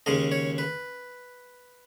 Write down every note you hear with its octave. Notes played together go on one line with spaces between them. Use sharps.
D#2 C#3 G#3 C#4 D#5
C#5
B4